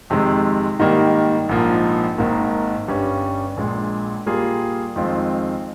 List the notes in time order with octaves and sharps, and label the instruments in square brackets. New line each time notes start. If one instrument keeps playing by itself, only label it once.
[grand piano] F2 C3 D#3 G#3
G#2 D#3 G3 A#3
A#1 G#2 F3 A#3
G#1 G#2 D#3 A#3
G1 G2 G3 C#4
A#1 A#2 G#3
A#2 G3 A#3 F4 G#4
F2 D#3 G#3 C4 F4